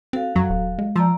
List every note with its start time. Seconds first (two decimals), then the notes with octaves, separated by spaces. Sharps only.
0.13 C4 F#4 A4 F5
0.36 F#2 F#3
0.50 D#1
0.79 G#3
0.96 F3 D5 A#5 E6